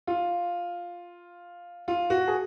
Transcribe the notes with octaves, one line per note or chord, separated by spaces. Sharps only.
F4
F4
F#4
G#4